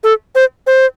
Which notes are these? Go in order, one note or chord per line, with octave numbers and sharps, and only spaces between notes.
A4
C5
C5